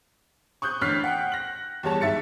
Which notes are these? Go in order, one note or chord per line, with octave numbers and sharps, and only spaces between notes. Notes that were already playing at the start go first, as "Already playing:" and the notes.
C#6 D#6 F#6 G6
A1 D3 F6 F#6 B6 C7
F#5 G5 F#6
A#6 F#7
E2 G3 C#5 A5
G#2 E5 A6 C#7